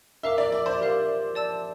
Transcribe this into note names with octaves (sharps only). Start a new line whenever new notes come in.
A#4 E5 F5 A#5 D6
D5
D5
C5
G4 A#4 F5
D5 A5 E6